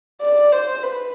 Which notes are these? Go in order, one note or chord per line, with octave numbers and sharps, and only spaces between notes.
D5
C5
B4